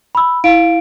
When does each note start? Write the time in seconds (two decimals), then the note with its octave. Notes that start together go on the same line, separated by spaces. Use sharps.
0.15 B5 E6
0.44 E4 F5 D7